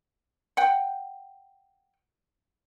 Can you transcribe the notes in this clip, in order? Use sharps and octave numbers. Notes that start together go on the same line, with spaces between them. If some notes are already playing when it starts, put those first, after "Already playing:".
F#5 G5